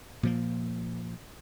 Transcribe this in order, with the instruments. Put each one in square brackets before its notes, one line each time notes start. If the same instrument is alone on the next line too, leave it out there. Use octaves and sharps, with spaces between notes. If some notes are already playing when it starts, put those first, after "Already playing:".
[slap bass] A#2 F3 A#3